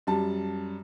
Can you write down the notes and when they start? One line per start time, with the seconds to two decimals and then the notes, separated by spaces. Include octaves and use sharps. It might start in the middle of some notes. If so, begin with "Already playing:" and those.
0.07 F#2 G3 A5